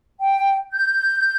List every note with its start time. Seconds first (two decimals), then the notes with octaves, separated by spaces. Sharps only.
0.20 G5
0.72 G6